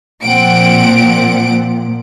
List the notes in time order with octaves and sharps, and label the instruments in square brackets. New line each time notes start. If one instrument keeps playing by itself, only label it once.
[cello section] A#2 F3 [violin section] C4 F#5 D7